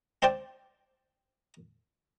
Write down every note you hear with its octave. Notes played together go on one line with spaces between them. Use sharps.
C4 D4 C5 D5 G5